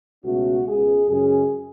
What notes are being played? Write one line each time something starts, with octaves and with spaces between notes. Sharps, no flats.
C#2 B2 A3 C#4 F#4
C#2 B2 G#3 G#4
F#2 C#3 G#3 C#4 G#4